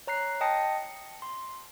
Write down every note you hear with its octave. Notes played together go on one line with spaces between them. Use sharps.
C#5 A#5 F#6 C7
D#5 G5 A5 D#6 A#6 C#7
C#7
C6